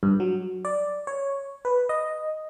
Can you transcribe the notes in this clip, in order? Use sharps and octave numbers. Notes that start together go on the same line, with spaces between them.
G2
F#3
D5
C#5
B4
D#5